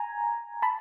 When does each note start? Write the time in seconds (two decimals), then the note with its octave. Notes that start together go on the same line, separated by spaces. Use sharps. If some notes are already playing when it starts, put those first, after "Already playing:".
Already playing: G#5 A#5
0.62 A5 B5